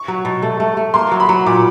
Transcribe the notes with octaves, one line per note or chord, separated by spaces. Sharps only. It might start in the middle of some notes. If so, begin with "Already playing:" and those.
Already playing: C#6
F#3
B2
A3
A3
A3
A#3 C6
F#3
B5
F#3
A#2 D6